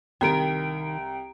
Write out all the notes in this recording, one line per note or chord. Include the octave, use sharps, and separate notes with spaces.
C2 D#3 A#4 G5 A#5 D7